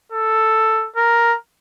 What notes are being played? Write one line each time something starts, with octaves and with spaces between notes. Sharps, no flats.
A4
A#4